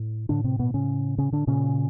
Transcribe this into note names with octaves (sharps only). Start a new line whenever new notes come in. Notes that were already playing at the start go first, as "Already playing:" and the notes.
Already playing: A2
A2 D3 D4
C3 C4
B2 B3
C#3 C#4
C#3 C#4
D3 D4
A#2 C#3 C#4